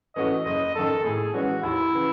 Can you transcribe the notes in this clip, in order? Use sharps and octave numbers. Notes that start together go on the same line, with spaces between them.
E3 A3 C#4 F#4 D#5
F#1 D#5
F#2 D#3 A4
A2 G#4
E3 G#3 C#4 F#4
D#2 E4
C#3 E3